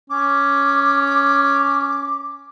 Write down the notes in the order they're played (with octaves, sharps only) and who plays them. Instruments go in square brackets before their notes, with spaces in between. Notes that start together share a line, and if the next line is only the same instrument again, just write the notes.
[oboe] C#4 [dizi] D6